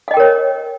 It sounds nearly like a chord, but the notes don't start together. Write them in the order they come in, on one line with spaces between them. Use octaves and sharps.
F5 D#5 G5 A#4 C#5